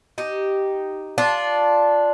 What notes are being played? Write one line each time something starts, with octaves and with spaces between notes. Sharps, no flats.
D#4 G4
D4 F4